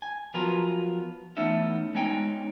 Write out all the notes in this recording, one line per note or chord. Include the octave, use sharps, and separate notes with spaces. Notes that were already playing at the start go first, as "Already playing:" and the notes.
G#5
F3 F#3 B3 F4 A#4 B4
E2 A3 B3 C#4 D#4 E5
G#3 B3 C#4 D#4 G5 G#5